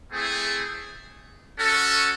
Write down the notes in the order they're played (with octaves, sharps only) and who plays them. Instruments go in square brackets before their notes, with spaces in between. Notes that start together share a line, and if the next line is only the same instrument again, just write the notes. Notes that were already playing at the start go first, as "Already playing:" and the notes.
[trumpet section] A3 C4 E4 G#4
C#4 F#4 A4